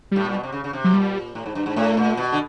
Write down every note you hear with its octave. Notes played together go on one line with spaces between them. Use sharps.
A2 G3
A#2
B2
C3
C#3
C#3
C3
F#3
A#2 G3
A2
G#2
G2
G#2
A2 A3
A#2
B2
D3